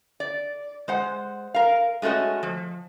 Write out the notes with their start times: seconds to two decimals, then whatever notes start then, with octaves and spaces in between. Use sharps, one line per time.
0.20 D5
0.88 G#3 C5 F#5
1.54 A#4 F5
2.02 G#3 A3 C#4 F#4 D#5
2.43 F3